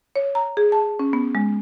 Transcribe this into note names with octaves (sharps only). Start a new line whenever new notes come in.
C#5
A#5
G#4
A5
C#4
B3
G#3